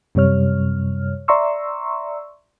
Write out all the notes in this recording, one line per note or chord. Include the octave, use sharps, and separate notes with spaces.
F#2 C3 G3 C#5 F6
D5 E5 A#5 C6 C#6 E6